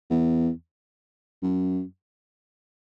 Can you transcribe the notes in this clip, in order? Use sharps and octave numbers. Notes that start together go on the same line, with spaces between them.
E2
F#2